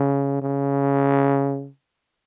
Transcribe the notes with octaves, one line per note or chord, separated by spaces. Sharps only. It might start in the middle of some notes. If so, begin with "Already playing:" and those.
Already playing: C#3
C#3